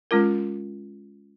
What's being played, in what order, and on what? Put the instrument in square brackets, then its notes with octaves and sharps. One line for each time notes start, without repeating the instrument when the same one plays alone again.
[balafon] G#3 C#4 F4 A#4